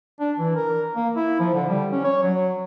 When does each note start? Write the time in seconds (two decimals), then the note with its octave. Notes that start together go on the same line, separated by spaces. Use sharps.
0.20 D4
0.39 E3
0.56 A#4
0.96 A#3
1.16 E4
1.40 F3
1.54 D3
1.69 G3
1.92 C#4
2.04 C#5
2.23 F#3